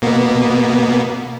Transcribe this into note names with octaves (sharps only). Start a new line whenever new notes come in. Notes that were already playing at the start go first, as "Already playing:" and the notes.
B2 A#3 B3